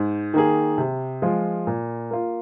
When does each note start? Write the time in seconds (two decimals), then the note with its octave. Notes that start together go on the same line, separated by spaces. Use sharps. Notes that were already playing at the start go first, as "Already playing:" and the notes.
Already playing: G#2
0.34 D#3 A#3 G#4
0.78 C3
1.22 F3 G#3 F4
1.67 A#2
2.11 A#3 F4